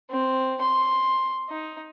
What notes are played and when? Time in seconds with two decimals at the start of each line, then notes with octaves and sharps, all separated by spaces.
0.11 C4
0.61 C6
1.49 D#4